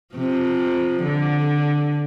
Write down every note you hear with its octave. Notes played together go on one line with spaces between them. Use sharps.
C3 F3
D3